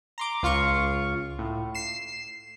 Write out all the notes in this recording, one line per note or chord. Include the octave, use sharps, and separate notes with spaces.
A#5 C6 D6
C#2 F4 F5 C#6
A2
C7 E7